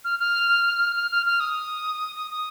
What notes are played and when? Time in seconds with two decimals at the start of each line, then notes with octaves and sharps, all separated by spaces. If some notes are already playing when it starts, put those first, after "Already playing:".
0.04 F6
0.19 F6
0.96 F6
1.11 F6
1.26 F6
1.40 D#6
2.16 D#6
2.31 D#6